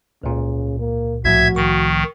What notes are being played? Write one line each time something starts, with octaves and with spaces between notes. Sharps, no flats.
C#2 A#2 C#3
A#3
C2 A2 F3 F#4 E5 G#6
D#3 C#6